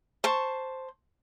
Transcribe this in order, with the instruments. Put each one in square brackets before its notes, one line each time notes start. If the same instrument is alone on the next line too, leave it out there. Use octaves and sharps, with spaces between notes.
[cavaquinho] C5 A5 C#6